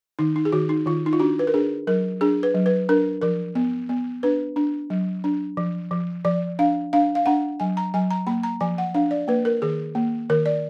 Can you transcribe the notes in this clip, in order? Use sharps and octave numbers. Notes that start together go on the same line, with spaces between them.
D#3 D#4
D#4
G#4
D#3 F#4
D#4
D#3 F4
D#4
F4
D4 F#4
B4
A#4
D4 G#4
F#3 A#4
D4 G#4
B4
F#3
B4
D4 A#4
F3 A#4
B3
B3
D4 B4
D4
F#3
D4
F3
F3
F3 D5
D4 F5
D4 F5
F5
D4 F#5
F#3 G#5
A#5
F#3 G#5
A#5
A#3 B5
A#5
F3 G#5
F#5
D4 F5
D5
A#3 B4
A#4
D#3 G#4
A#3
D#3 A#4
D5